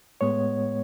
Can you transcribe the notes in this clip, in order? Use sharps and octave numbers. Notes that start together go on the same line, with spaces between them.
A2 G#3 B3 C#5